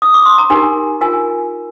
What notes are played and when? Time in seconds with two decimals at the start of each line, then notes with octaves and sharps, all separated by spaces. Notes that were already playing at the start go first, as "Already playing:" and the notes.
0.02 D#6
0.14 D6
0.26 C6
0.38 A#5
0.50 D#4 G4 A#4 G#5
1.01 F4 A#4 G#5